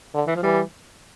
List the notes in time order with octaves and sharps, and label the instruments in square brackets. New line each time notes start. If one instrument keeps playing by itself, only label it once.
[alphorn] D3
[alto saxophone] E3
F3
[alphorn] E3 [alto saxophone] G3